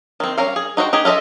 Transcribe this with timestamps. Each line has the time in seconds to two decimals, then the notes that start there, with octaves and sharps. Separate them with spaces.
0.20 D#3 C4
0.38 G3 C#4 A#4 F5
0.56 G#4
0.77 D#4 F#4 C5 E5 G5
0.93 D#4 G4 G#4
1.05 F4 A4 D#5 E5